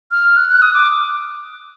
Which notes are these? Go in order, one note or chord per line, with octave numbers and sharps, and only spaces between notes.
F6
F#6
F#6
D#6
D6